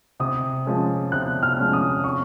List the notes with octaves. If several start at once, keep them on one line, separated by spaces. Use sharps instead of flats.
C3 D#6
F3 G#3 C#4
C3 F#6
F6
F3 G#3 C#4
D#6
C#6